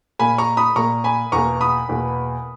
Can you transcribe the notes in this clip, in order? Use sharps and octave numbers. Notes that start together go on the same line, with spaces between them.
A#2 A#3 G#5 B5
A#5 C#6
B5 D#6
A#2 A#3 A#5 C#6
G#5 B5
E2 B2 A#3 A#5 C#6
B5 D#6
E2 B2 A#3